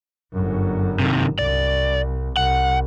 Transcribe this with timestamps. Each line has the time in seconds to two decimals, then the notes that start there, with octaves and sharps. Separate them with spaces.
0.33 G1 F#2
0.99 C3 D#3
1.39 C2 D5
2.37 C2 F#5